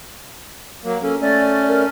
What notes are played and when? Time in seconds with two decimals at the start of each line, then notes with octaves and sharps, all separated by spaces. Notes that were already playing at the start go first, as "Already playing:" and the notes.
0.84 F#3 A#3
1.02 C#4 A4
1.21 A3 C#4 D5
1.68 A#4